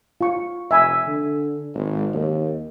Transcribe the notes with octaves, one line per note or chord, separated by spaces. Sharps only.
F4 C#6
F1 E5 G#5 B5
D3
G#1
D#2